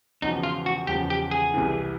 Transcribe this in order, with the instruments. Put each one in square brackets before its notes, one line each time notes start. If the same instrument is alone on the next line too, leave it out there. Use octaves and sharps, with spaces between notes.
[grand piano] E1 E2 C#3 F3 [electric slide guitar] D#4
[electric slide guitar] F4
F#4
[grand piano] E1 E2 C#3 F3 [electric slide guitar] G4
[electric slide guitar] G4
G#4
[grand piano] C2 C3 E3